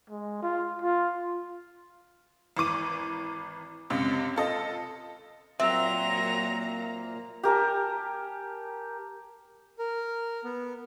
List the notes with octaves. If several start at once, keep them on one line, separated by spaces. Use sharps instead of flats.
G#3
F4
F4
G#1 E3 D6 D#7
C#2 F#2 C3
F4 A4 D#5
A#2 F#3 A#3 C4 E5 A#5
G4 A#4 G#5 A5
A#4
B3